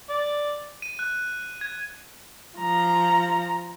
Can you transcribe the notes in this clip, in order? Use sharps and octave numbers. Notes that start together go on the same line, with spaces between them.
D5
D#7
F#6
G#6
F3 A#5